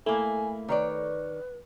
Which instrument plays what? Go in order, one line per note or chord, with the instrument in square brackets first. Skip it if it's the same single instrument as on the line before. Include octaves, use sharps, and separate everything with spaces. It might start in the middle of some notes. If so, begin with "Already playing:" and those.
[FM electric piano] A3 [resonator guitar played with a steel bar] A#3 E4 [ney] G#5
[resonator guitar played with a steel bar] D#3 C#5 D5 [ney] B4